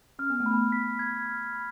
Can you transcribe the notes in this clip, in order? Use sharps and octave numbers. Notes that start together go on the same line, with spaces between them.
C#4 F6
B3
A3
B5
B3
B6
G#6
F6
B5